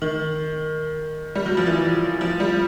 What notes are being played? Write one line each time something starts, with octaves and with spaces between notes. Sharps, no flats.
D#3
G3
F#3
F3
E3
F3
G3